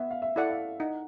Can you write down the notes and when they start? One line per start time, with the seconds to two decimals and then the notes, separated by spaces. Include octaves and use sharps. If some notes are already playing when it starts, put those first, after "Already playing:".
Already playing: B3 E5
0.11 F5
0.22 E5
0.36 E4 A4 D5 F#5
0.50 F5
0.79 D#4 F#5